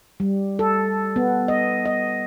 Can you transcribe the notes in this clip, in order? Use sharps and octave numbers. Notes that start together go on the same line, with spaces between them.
G3
A4
B3
D#5
D#5